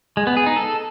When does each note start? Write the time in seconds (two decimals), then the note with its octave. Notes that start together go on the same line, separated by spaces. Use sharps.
0.17 G#3
0.27 B3
0.37 G#4
0.46 D#4
0.56 A4